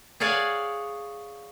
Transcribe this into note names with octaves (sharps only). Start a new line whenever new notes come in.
G#4 C#5 D5 F5 F#5 G#5